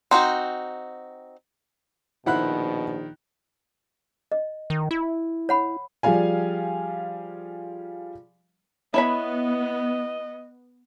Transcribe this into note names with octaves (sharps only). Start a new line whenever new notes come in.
C4 D#4 F#4
A#1 B2 D#3 E4 C5 F#5 B5 F#6
D#5
D#3
E4
C#5 F#5 B5
F3 G3 G#4 F5 G#5
B3 E4 C#5 D#5 B5